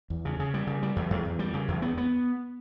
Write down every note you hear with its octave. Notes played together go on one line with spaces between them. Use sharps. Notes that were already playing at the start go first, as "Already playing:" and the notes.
E2
C#3
C#3
G3
C#3
G3
E2
E2
E2
G3
C#3
E2
B3
B3